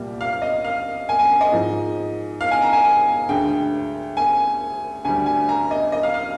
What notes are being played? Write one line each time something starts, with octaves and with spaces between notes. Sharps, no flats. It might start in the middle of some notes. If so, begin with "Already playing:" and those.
Already playing: C2 A#2 G3
F5
D#5
F5
G#5
G#5
D#5
G#2 F3 G#3
F5
G#5
A#5
G#5
G#5
D2 D3 G#3 G5
G#5
D2 D3 G3 G#5
G#5
A#5
D#5
D#5
F5
F5